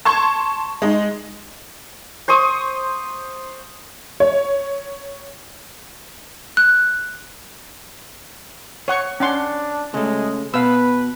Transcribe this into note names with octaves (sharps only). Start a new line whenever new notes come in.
A5 C6 C#6 G#6
G#3 D#4
C5 C6 C#6 D#6
C#5
F#6
C#5 F#5 C#6
C#4 D4 F#5 C6
C#3 G#3 A3
B2 B4 F5 E6